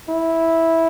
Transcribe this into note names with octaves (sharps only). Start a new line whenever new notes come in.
E4